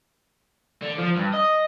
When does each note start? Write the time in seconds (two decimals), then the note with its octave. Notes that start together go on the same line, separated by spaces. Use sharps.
0.82 D3
0.98 F3
1.16 G2
1.33 D#5